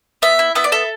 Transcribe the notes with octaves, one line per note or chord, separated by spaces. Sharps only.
B3 E5
E4
B3 E5
D5
A4 E5